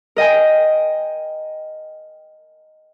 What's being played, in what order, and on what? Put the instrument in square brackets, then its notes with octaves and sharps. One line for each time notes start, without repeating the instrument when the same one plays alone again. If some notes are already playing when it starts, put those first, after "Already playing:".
[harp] A#4 D#5 G5 G#5